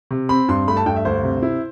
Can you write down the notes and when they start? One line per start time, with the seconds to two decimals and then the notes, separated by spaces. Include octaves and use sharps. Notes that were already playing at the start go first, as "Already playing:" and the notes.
0.11 C3
0.29 C4 B5
0.48 G2 C6
0.68 A3 B5
0.77 A5
0.86 G2 G5
0.96 E5
1.05 D2 C5
1.23 C3
1.43 E4